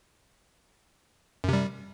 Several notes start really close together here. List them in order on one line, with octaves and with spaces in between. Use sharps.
F#2 C3 G3